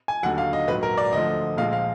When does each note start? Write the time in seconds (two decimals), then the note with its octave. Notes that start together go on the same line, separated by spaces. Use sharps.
0.08 G#5
0.23 D#2 D3 F#3 F#5
0.38 F5
0.53 D#5
0.68 A#1 G#2 F#3 B4
0.83 A#4
0.98 D5
1.13 D2 D3 F3 D#5
1.57 A#1 A#2 F3 G#3 F5
1.73 F5